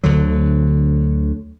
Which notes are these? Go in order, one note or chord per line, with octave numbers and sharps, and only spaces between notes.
D2 D3 F#3